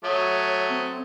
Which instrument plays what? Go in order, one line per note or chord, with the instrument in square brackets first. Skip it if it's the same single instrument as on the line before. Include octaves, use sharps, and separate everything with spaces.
[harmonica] F#3 A3 D#6 [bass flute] C#5
[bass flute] C4